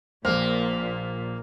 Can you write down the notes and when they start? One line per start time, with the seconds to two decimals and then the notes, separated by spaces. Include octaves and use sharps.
0.25 A#1 A#2 A#3 C5 F6